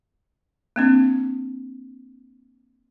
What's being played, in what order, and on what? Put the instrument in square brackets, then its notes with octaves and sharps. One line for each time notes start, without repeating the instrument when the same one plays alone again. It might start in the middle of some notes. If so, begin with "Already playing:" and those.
[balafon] A#3 C4 D4